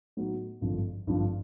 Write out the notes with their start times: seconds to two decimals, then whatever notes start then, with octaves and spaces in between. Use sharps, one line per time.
0.17 A2 F#3 B3 D#4 F#4
0.61 G#1 G2 D3 F3
1.07 G#1 G2 D3 F3